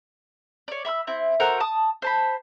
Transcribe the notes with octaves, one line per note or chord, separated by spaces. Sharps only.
C#5 D5
E5 B5 C6 E6
C4 E4
F#4 A4 A#4 C5
A5 D#6
C5 A5 B5